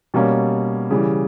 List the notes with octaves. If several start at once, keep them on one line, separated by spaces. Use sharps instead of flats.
B2 G3 A#3 C#4
C#3 E3 G3